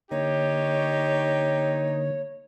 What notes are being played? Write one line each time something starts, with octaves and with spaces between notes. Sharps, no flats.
D3 A#3 D#4 G4 C#5